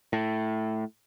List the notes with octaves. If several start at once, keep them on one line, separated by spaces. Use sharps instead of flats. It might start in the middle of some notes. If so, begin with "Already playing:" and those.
A2